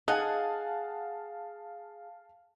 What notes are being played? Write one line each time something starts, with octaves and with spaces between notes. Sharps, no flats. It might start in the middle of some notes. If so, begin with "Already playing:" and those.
D#4 G#4 F5 F#5 G#5 A5